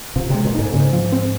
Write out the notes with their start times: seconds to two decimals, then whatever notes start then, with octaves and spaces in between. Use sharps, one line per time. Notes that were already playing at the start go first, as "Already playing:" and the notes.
0.16 C3 F3
0.30 C3 G#3
0.45 A#2
0.55 G#2 D#4
0.73 G#2 C#3
0.93 F3
1.12 C4